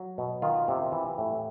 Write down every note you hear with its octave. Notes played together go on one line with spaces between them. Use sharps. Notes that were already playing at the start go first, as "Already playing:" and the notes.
Already playing: F#3
B2
D#3 F4
C3
E3
A2